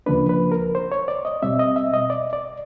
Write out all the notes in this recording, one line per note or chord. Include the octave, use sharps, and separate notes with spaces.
D2 C#3 F3 A#3 D4 B4
B4
A#4
C5
C#5
D5
D#5
B2 G3 C4 E5
D#5
E5
D#5
D5
D5